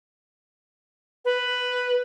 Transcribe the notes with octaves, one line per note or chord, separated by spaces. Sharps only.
B4